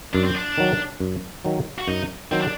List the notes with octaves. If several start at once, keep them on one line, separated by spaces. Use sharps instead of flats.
F#2 D4
C4
D4
D#3 F#3
F#2
D#3 F#3
F#4
F#2 D#4
D#3 F#3 C4
D4